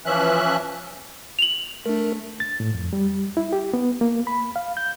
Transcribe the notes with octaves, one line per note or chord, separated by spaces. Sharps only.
E3 F3 C#4 E5 F#6
F7 F#7
A3 D4 A#4
A6
A2
F2
G3
E4
G4
B3
A#3
B5
F5
G6